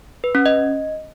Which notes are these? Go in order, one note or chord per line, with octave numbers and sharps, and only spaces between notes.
B4
C#4
D#5